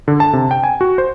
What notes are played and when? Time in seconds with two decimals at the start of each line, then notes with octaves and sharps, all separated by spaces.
0.08 D3
0.20 A5
0.33 C3
0.51 G5
0.64 G#5
0.81 F#4
0.98 C5